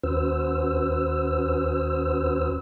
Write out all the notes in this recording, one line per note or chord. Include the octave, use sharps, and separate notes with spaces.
D#2 C#4 F#4 B4 C5 E6